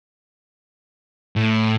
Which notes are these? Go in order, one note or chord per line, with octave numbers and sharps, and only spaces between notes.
A2